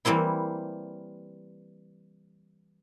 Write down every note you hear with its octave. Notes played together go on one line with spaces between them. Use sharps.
E3 G3 A#3 C4 E4